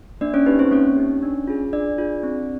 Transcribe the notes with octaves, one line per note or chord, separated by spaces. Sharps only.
A#3 D4 D5
C#4 C#5
D#4 G4 B4
C4 C5
A#3 C#4 C#5
D#4 G4
D4
F4 G#4
D4 D5
F4 G#4
C4